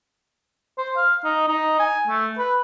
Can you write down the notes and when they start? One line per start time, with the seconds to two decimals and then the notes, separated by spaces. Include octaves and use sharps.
0.78 C5
0.97 F5
1.24 D#4
1.48 D#4
1.80 G#5
2.07 A3
2.38 B4